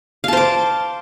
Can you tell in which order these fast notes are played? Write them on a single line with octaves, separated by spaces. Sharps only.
F5 A5 C5 D6